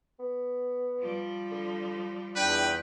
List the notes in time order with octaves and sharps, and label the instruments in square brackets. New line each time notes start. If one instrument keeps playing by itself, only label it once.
[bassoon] B3
[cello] F3 G3
[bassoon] D3
[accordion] E2 G5 [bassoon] D4 [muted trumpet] B4